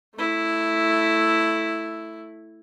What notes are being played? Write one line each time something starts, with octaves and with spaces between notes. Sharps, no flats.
A3 E4